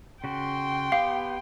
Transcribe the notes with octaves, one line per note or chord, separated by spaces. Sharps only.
C#3 F#4 G5 C6
B3 G4 F5 D6